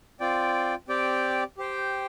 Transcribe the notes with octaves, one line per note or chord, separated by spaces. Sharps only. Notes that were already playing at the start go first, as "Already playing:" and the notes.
C4 F4 D5 G5
C4 G4 D5 G5
G4 C5 G5